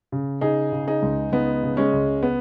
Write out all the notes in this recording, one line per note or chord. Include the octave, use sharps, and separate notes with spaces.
C#3
C#3 D#4 G#4
C#3
D#4 G#4
C#2
C#2 B3 D#4
C#3
G#3 C#4
C#2
B3